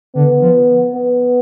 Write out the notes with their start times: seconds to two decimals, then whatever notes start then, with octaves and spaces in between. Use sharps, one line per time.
0.15 D3 B3
0.42 F3
0.95 B3